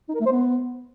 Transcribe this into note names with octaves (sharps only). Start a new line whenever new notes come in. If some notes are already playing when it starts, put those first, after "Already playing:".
D#4
A#4
A3
C5
B3